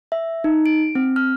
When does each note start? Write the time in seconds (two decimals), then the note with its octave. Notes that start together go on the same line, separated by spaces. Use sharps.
0.12 E5
0.44 D#4
0.66 D7
0.95 C4
1.16 F6